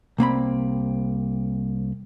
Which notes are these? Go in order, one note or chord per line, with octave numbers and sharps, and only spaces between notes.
C2 A#3 C4 B5